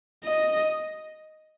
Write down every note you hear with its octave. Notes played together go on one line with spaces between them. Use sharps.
D#5